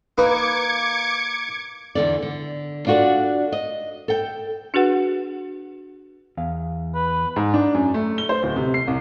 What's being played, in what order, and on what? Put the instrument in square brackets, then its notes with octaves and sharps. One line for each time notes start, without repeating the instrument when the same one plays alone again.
[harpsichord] A#3 D#4 B4 [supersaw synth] D6 G#6 C#7
[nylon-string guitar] E2 B2 D3 D5
D3
D4 F4 F#4 A4 D5
D#5
A4 G5
[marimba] D4 F#4 G#4 B4 F#5
[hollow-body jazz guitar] E2 F5
[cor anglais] B4
[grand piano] G#2
D4
F#2
A3
G7
C5
D1
C3
C7
C2